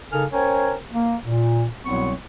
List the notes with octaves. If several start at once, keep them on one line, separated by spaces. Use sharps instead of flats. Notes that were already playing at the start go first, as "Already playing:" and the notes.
C#3 D#4 A4 A#4 G#5 F6
C#4 A#4 C5 C#5 G5 G#5
A#3
A#2
C2 B2 F#3 B3 C4 C#6